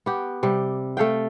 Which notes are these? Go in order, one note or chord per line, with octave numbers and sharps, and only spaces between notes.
B3 G4
C3 G3
A3 A4 F5 G5